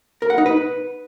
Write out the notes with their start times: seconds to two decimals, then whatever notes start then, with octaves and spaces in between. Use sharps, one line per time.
0.22 A#4
0.30 F#5
0.38 D#4
0.46 B4